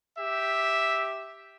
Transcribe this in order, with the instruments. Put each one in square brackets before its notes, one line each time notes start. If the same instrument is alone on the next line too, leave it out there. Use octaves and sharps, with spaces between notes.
[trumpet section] G4 E5